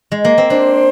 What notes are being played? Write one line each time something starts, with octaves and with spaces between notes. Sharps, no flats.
G#3
A#3
C4
D4 C5